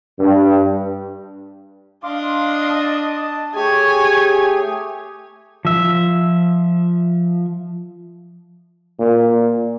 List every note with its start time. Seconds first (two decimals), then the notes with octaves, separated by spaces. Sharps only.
0.19 G2
2.04 D4 D#5 F5 C6 D6
2.71 A5
3.55 A3 G4 G#4 C#5 G#5
5.65 F3 E5
8.99 A#2